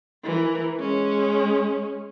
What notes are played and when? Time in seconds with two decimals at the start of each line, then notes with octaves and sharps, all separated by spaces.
0.24 E3 A#4
0.78 G#3 C#4